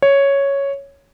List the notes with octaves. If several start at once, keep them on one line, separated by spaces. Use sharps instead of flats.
C#5